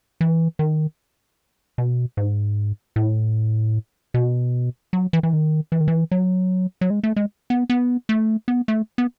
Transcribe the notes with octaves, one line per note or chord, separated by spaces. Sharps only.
E3
D#3
B2
G#2
A2
B2
F#3
E3
E3
D#3
E3
D#3
E3
F#3
F#3
G#3
A3
G#3
B3
B3
A3
B3
A3
B3